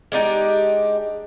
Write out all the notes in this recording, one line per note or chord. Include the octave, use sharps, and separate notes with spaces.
G#3 D4 D#4 G4